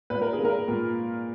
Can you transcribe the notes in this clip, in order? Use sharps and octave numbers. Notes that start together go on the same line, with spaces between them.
A#2 B4
A#4
G#4
A#3
A#4
A#2